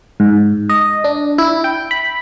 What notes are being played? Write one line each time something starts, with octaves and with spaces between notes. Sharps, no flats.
G#2
D#5
D4
E4
G5
B5